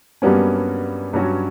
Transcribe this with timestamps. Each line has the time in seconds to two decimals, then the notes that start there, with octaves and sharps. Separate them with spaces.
0.22 G2 F#3 G3 A#3 B3 C#4
1.14 G2 F#3 C#4 F#4